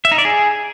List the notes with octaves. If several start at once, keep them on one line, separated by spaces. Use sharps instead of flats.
E5
D#4
D5
G#4